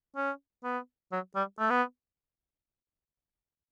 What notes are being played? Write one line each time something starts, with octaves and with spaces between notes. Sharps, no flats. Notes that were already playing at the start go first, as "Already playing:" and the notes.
C#4
B3
F#3
G3
A3
B3